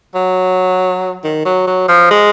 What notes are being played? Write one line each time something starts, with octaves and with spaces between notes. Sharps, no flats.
F#3
D#3
F#3
F#3
F3
G#3